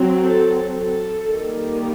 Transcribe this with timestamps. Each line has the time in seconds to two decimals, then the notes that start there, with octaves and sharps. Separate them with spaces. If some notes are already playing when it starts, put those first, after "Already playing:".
Already playing: F#3 C4
0.23 A4
0.76 A4
1.30 D#3 G3 A#3